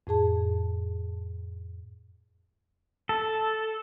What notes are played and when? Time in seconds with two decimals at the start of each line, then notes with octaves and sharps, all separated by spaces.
0.07 F2 A2 G#4 A5
3.09 A4